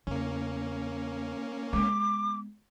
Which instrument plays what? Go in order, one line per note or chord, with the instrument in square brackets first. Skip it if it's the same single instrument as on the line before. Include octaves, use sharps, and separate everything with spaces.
[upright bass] E2 C#3 [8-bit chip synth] A#3 C#4
[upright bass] G#3 B3 [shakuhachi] D6